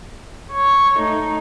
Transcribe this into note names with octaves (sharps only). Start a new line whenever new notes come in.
C#5
A3 D#4